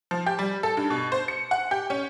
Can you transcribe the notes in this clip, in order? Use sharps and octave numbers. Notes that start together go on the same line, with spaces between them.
F3
G4
G3
A4
G2
B2
C5
C#7
F#5
G4
C#4